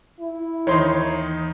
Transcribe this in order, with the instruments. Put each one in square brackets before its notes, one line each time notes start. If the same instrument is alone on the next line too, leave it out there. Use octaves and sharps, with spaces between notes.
[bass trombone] E4
[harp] D#2 E3 [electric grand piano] D#3 D#4 [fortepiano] C#5 C6